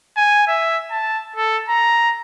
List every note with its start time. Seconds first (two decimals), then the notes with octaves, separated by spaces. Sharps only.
0.17 G#5
0.47 E5
0.91 A5
1.36 A4
1.69 A#5